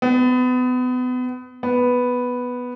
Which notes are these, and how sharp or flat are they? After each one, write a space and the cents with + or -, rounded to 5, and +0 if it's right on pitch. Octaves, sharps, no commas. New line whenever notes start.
B3 +30
B3 +0